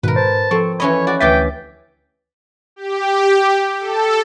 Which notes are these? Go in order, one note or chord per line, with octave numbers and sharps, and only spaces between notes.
G#2 B2 D#3 A#4 B4
C5 A5
F3 C4 A4 C#6
E3 C#4 C#5 D#5 B5
F#4 D5
D2 E3 G4 E5 G5 G#5 A6 B6
G4
A4